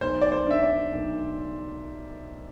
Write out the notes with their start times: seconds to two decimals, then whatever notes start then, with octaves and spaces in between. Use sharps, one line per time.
0.01 B1 C5
0.21 D5
0.32 C5
0.47 D4 E5
0.62 D5
0.93 B1